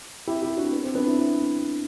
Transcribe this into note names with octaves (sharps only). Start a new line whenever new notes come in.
E4 G4
E4 G4
D4 F#4
B3
C4
B3 D4
C4 E4
C4 E4